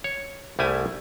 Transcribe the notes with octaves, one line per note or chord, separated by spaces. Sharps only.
C#5
C2 G3 A3 E4 G#5